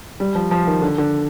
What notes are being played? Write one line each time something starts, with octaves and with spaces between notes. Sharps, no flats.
G3
F3
F3
D#3
D3
D3